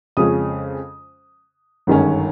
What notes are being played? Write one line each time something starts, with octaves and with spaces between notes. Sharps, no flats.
F2 C#3 F3 G#3 C#4 D#6
G1 F#2 D#3 G#3 C#4